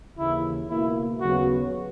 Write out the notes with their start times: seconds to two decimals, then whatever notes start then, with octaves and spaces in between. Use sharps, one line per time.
0.16 D#2 C#3 E3 A#3 E4
0.68 C#2 B2 A#3 E4
1.20 D#2 C#3 F#3 B3 F#4